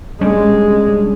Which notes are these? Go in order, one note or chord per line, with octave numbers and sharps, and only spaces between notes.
G3 G#3 C#4 D4